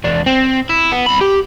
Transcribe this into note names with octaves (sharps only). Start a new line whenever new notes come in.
E2 D4
C4
E4
B3
C2 B5
G4